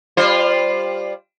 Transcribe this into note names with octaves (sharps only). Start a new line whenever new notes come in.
G3 F4 C5